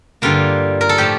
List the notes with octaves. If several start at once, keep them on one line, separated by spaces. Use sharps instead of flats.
G2 D3 G3 A#3 F4
A#4
A4
A2 F3 A3 G4